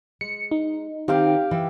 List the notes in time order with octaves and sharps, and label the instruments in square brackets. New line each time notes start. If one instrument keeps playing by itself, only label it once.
[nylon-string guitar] G#3 [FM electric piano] C#7
[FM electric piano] D#4
[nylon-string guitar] D#3 C4 [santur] G4 F5 G5
[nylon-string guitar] E3 E5